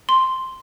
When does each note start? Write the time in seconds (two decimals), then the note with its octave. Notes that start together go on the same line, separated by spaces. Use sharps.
0.09 C6